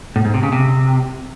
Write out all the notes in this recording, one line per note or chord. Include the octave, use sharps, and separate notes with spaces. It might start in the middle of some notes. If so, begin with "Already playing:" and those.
A2
G#2
C3
C#3
C3